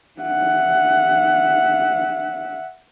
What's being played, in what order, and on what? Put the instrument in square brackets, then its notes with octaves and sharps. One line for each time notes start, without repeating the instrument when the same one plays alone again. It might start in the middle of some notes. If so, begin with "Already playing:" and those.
[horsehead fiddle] E5 F#5